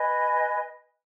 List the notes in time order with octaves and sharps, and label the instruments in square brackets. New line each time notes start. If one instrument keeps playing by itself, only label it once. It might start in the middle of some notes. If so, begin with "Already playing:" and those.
Already playing: [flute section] B4 D#5 G#5 B5